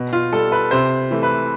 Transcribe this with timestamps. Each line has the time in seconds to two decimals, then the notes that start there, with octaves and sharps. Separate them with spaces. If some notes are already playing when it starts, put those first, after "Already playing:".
Already playing: B2
0.13 F4
0.33 G3 A4
0.52 B4
0.71 C3 C5
1.11 E3 A3
1.23 B4